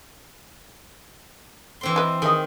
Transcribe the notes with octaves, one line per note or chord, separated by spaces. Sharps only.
E3 C4 C6
E4 B4 D#5
D#3 G#4 D#5